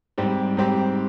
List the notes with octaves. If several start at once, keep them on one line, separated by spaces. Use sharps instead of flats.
G#2 G3 C4 G4
G#2 G3 C4 G4